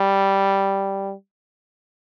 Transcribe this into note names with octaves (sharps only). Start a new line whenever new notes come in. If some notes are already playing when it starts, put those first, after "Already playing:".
Already playing: G3